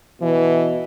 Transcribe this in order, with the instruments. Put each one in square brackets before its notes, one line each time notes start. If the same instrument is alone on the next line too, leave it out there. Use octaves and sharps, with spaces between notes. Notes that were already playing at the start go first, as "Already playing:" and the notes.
[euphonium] B2 [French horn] E3